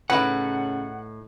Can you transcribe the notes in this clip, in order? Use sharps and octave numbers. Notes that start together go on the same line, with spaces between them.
A2 C#3 D#4 E4 B4 F#5